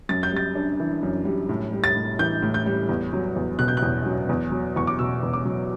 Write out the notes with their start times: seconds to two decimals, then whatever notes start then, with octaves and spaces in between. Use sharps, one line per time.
0.09 F#2 A6
0.23 G6
0.32 G3 A6
0.55 D4
0.80 E3
1.03 F#2
1.25 G3
1.49 A2
1.73 G3
1.84 A6
1.96 A2
2.19 E3 G6
2.42 A2
2.54 G6
2.66 G3
2.89 E2
3.13 F#3
3.36 E2
3.59 B2 F#6
3.68 G6
3.77 F#6
3.82 E2
4.06 F#3
4.29 E2
4.52 F#3
4.76 E2 C#6
4.87 D6
4.99 B2 E6
5.23 E2
5.33 D6
5.45 F#3